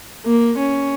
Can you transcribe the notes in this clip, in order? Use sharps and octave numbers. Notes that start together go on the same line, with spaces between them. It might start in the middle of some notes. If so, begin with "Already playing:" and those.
A#3
C#4